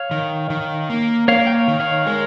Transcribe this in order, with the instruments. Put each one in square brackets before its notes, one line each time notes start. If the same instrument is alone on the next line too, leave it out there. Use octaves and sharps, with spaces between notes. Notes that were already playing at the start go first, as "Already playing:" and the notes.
Already playing: [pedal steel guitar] C#5 F5
[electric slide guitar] D#3
D#3
A#3
[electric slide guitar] A#3 [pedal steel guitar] C#5 F5
[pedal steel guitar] G5
C#5 F5
[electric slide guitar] D#3
[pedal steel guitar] C#5 F5
[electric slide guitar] G#3 [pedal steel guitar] A#4 C#5